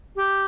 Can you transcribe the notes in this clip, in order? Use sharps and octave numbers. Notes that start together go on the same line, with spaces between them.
G4